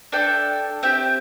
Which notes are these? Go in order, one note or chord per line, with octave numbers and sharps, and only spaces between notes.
D4 A4 E5 G5
C4 G4 E5 G5